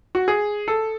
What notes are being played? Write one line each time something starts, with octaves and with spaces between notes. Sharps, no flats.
F#4
G#4
A4